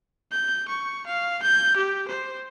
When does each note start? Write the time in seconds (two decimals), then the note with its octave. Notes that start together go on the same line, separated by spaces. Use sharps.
0.31 G6
0.68 C#6
1.06 F5
1.42 G6
1.76 G4
2.08 C5